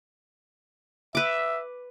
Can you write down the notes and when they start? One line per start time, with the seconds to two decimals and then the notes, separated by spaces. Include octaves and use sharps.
1.15 B4 E5 D6